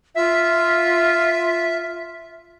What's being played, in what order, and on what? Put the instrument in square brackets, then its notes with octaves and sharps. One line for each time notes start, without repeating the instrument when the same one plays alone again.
[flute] F4 [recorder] E5